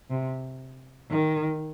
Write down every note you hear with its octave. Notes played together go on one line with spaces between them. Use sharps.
C3
D#3